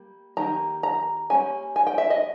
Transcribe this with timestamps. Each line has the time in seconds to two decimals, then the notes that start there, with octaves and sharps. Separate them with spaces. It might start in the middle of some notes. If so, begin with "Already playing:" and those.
Already playing: G3 A#3
0.37 D#3 G3 A#3 D#4 A#5
0.83 A#5
1.30 G3 A#3 C#4 G#5
1.76 G#5
1.87 G5
1.98 E5
2.10 D#5